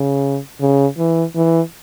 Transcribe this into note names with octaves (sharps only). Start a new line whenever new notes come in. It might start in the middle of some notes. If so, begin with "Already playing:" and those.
Already playing: C#3
C#3
E3
E3